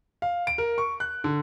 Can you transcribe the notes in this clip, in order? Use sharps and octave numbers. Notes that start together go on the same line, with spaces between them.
F5
D7
A#4
C#6
F#6
D3